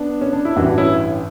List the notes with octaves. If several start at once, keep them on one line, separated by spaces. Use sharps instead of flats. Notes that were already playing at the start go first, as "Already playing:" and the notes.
Already playing: B3 D4
C#4
D4
E4
A1 G2 E3 D4 F#4
C#4 E4